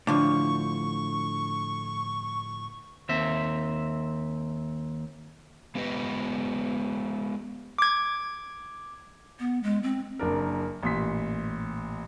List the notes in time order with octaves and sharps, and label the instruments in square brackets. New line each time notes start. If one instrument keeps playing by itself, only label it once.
[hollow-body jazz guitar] A2 D3 F3 [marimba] D4 [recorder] C#6
[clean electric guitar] D#2 C4 E5
[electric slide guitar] G#3 B3 G4 B4 D#5
[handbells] D6 G#6
[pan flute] B3
G#3
C4
[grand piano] F#1 D4 A#4
A1 A#2 C6 B6